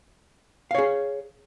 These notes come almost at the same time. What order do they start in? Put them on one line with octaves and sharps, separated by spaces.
F5 C#5 G#4